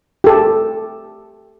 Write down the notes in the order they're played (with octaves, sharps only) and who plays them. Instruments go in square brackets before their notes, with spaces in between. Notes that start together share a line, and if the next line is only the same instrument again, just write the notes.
[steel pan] G4 A4